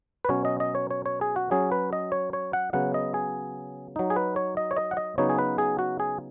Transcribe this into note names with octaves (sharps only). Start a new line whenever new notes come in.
B4
B2 F#3 C#4 C#5
D#5
D#5
C#5
C#5
C#5
G#4
F#4
F#3 C#4 G#4
B4
D#5
C#5
C#5
F#5
C#3 F#3 B3 F#5
D#5
G#4
F#3 D#4
G#4
B4
C#5
D#5
C#5
D#5
F#5
D#5
C#3 F#3 B3 D#4 C#5
G#4
B4
G#4
F#4
G#4